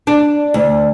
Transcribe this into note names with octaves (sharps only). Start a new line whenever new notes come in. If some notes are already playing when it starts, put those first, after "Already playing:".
D4
D2